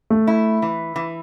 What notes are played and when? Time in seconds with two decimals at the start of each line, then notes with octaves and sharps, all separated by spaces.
0.10 A3
0.27 E4
0.62 E3
0.96 E3